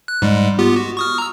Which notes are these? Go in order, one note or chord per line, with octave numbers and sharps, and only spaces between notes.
F#6
G#2 G3 G#3
B3 F4 G4
F#4
C#6 D#6 F6
A#5 E6